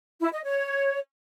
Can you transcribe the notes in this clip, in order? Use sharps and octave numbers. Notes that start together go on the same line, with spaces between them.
E4
D#5
C#5